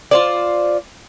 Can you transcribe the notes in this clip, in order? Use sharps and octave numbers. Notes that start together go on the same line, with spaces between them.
F4 C5 D5